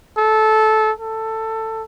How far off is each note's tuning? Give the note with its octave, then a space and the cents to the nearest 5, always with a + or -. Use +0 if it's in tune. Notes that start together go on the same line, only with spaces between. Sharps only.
A4 -15
A4 +15